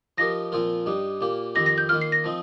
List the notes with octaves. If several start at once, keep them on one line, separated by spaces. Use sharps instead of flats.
F3 D#4 G4 A#4 A#6
A#2 F3 C4 F4 A#4
G2 G3 D#4
A#2 A#3 G4
F2 D#3 C4 G4 A#6
A#6
G6
D#3 A#3 F4 F6
C7
A#6
F3 C4 D#4